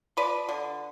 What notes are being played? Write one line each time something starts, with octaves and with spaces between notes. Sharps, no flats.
F3 B4 D5
D3